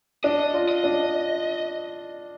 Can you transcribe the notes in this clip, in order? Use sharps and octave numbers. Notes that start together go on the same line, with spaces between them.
D4 D#5
F4
D#5
D4